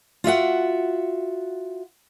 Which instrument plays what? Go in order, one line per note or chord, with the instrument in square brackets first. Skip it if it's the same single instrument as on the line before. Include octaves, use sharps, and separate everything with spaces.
[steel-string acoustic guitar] F4 F#4 E5 F#5